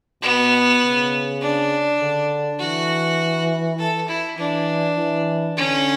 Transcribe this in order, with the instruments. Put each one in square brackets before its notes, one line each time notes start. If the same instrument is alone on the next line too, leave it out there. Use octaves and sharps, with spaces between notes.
[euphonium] B2 [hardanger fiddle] B3
[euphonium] C#3
[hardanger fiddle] D4
[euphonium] D3
[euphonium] E3 [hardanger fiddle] F#4
[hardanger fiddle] A4
E4
[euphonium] E3 [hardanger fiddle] D4
[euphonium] E3
[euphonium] D3 [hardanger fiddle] C#4